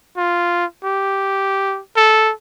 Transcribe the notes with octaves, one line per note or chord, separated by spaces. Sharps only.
F4
G4
A4